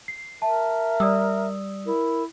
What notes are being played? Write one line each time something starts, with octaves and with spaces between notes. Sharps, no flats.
C7
A#4 E5 A5
G3 D5 D#6 E6
E4 A#4